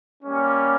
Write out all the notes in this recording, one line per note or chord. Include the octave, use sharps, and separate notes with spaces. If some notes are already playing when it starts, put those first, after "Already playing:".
G3 A#3 C#4